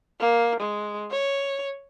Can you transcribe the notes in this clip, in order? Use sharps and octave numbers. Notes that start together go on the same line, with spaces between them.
A#3
G#3
C#5